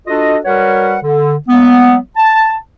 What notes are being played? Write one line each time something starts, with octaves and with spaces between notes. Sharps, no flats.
D4 F4 F#4 A4 D#5
G3 F#4 A#4 B4 C#5 F#5
D3
F#3 G#3 A#3 B3
A5